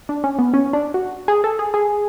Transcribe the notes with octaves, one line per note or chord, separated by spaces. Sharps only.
D4
C#4
B3
C#4
D4
F#4
G#4
A4
G#4
G#4